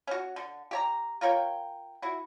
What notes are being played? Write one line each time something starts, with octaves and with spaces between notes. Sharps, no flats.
C#4 F#4
D3
G4 C#5 A#5
F4 A#4 C#5 G5
E4 F#4